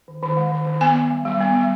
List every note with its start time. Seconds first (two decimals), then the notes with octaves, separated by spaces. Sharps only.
0.08 D#3
0.22 D#3
0.37 G#3
0.52 D#3
0.66 D#3
0.81 B3 G#5
0.96 B3
1.10 G3
1.25 G3
1.41 B3
1.55 G3